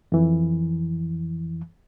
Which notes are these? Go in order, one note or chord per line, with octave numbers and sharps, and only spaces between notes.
F2 E3